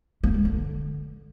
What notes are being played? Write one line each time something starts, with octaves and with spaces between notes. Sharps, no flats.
A#3
G#3
D3